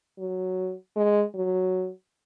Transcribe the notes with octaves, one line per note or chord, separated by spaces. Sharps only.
F#3
G#3
F#3